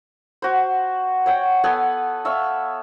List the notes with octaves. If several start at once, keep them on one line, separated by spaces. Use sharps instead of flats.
F#4 C5
C#5 F#5 G5
B3 A4 B4 G#5
E5 F5 C#6